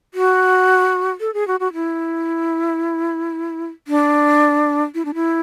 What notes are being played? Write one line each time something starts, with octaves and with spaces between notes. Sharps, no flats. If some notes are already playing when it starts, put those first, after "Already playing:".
F#4
A4
G#4
F#4
F#4
E4
D4
E4
D4
E4